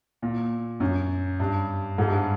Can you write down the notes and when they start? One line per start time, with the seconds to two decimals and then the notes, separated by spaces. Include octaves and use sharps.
0.22 A#2
0.80 F#2
1.40 G2
1.98 G#2
2.07 G2